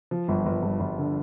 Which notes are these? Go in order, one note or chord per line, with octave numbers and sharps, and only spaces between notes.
F3
G1
G1
G2
G1
D3